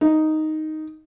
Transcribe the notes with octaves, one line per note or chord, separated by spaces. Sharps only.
D#4